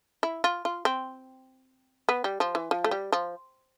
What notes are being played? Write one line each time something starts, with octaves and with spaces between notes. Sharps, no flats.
E4
F4
F4
C4
B3
G3
F3
E3
F3
A3
G3
F3